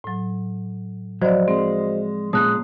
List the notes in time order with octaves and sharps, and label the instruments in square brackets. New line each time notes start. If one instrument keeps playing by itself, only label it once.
[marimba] A2 F#3
[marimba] F3 D5 [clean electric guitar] F#3 [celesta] F#4 C5 D#5
[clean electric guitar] G#3 [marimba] C4
[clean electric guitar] A#2 G#3 C#4 [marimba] A#3 A5 [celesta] D#6 F#6